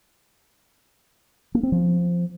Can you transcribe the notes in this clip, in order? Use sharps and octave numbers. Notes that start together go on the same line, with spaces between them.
A#3
C4
F3